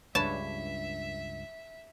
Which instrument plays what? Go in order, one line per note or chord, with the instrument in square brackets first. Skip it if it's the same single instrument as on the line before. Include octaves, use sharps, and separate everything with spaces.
[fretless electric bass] C#2 G2 [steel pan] D4 B4 C#5 [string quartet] E5 [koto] A5